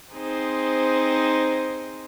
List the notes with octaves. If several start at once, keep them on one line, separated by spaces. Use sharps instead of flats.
C4 D#4 G#4 C5